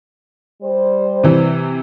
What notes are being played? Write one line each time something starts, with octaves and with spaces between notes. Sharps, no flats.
G3 C5
C3 E3